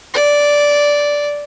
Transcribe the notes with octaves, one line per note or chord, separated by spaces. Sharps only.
D5